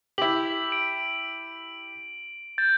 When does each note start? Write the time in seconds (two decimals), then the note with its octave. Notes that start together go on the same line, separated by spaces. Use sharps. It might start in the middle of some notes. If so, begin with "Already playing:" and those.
0.18 E4 G4 F#7
0.72 D7
2.58 G6 A6